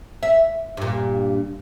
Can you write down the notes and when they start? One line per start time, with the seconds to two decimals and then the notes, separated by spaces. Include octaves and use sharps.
0.23 E5
0.77 G2 A#2